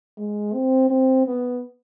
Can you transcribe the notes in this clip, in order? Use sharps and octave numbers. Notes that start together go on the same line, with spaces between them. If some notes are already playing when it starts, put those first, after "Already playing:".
G#3
C4
C4
B3